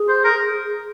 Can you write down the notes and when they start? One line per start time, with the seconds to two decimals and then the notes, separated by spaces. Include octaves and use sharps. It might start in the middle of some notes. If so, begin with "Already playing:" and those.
Already playing: G#4
0.09 C5
0.24 A#4